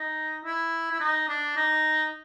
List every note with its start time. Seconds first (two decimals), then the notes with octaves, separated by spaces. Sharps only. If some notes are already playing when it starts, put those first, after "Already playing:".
Already playing: D#4
0.45 E4
0.91 E4
1.00 D#4
1.28 D4
1.56 D#4